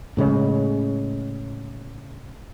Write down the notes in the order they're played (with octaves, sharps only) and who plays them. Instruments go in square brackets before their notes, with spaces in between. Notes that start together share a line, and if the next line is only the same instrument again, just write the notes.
[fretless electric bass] A2 C#3 G#3 C#4